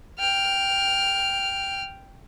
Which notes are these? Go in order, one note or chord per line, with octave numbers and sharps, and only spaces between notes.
G5 F6